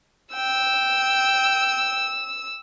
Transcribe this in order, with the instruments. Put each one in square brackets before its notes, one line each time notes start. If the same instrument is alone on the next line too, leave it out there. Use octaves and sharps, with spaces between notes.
[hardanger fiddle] G5 [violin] E6